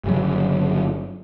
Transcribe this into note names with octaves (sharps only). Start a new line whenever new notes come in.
G1 C#3 F#3